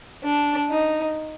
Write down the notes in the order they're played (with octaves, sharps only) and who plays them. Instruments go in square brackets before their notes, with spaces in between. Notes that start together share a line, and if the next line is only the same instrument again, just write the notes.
[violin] D4
D#4